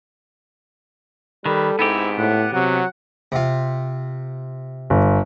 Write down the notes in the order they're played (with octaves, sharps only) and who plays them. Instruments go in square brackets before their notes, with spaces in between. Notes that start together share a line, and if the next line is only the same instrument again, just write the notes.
[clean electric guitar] D#3 [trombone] G3 [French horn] A4 [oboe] B4
[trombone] G#2 [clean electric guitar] B3 C4 G4 [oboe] E4
[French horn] A2 [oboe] F#5
[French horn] C3 [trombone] F#3 [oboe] F#5
[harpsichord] C3 F4
[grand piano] G1